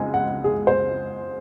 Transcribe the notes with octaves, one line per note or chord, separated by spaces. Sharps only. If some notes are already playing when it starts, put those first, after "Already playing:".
Already playing: C#2 C#3 G#3 C4 D#4 G#5
F#5
G#4
C5